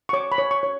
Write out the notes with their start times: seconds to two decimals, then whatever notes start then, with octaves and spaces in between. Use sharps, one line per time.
0.09 C#6
0.13 C#5 D6
0.32 B5
0.38 C#5
0.51 C#6
0.63 C#5